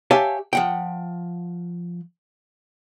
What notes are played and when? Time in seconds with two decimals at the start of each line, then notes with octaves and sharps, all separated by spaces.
0.11 G4 C#5 E5 F5 G#5 A5
0.53 F3 F#5 G5